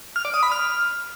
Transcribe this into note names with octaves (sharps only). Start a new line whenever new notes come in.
F6
D5
D#6
B5
F6